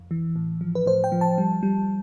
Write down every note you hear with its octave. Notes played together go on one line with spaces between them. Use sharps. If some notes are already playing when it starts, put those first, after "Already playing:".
Already playing: F2
E3
A2
F3
B4
A2 C5
G5
F3
A5
G3
G3